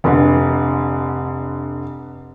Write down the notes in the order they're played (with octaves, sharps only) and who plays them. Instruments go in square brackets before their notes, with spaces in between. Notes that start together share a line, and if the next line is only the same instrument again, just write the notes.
[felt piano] F1 D3